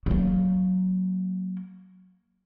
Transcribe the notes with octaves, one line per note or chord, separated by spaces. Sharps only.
F#3 A#3